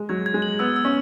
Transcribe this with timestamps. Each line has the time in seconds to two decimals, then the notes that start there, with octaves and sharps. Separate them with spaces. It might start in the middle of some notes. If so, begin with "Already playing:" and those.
Already playing: G#3
0.09 F#3 G#6
0.26 G#6
0.34 G#3
0.42 F#7
0.59 B3 E6
0.76 E6
0.85 C#4